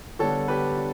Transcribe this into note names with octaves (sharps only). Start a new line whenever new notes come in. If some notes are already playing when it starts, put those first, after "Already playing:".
D3 G3 B3 D4 A4 C#5
G4 B4
D4